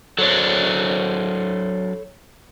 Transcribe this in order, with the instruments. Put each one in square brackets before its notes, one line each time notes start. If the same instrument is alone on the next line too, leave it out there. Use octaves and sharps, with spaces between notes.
[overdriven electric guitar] F#3 D4 [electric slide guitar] A4 C5 C#5